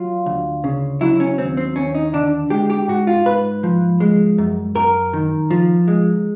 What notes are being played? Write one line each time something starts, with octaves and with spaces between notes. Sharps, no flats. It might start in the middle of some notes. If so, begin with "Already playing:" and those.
Already playing: F#3 F4
D2
C#3
F#3 E4
C#4
D#2 C4
C4
D#2 C#4
D#4
D3 D4
G#3 G4
G4
G#2 F#4
F4
G#2 B4
F3
G#3
F#2
F#2 A#4
D#3
F3
G#3